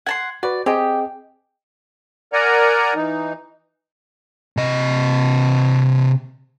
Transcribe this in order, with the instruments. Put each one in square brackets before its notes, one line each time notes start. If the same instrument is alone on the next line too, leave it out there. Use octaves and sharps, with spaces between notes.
[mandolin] F#5 A5 C6 [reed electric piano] G#6
[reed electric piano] F#4 B4 [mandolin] D5
[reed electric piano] C4 G#4 D#5 [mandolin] G4
[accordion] A#4 D5 F#5 G#5 A#5
E3 D#4
[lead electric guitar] C3 D#5